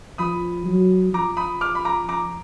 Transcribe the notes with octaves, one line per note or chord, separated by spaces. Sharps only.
F3 B5 D#6
F#3
F3 A#5 D6
B5 D#6
D6 F6
B5
A#5 D6
A#5 D6